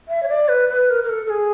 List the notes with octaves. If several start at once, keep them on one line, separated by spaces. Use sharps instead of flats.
E5
C#5
D5
B4
B4
A#4
A#4
A4
A4
G#4